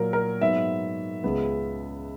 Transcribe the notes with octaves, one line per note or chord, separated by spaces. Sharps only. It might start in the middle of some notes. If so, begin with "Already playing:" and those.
Already playing: A#2 F#3 A#3 A#4
A#4
G#2 F#3 B3 E5
C#2 C#3 G#3 B3